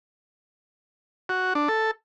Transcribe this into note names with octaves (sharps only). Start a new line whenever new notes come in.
F#4
D4
A4